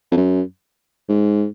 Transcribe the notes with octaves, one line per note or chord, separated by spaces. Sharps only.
F2
F#2
G#2